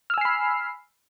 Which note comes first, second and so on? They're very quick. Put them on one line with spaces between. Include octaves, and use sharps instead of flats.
F6 E6 G#5 C7 B5